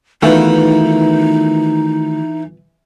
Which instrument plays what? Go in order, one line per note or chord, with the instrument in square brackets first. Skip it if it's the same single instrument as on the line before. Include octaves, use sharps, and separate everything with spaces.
[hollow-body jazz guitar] D#3 A3 F#4 [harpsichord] E3 [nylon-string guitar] B3 F4 B4 [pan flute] D#4